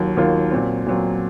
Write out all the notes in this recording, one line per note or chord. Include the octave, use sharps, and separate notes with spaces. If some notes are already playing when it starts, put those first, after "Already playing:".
Already playing: D#2 D#3 F#3 A#3 F4
D#2 D#3 F#3 A#3 F4
A#2 F#3 C4
A#2 F#3 C4